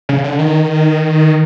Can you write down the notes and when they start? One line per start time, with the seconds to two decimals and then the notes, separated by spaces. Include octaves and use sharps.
0.09 C#3
0.24 D3
0.39 D#3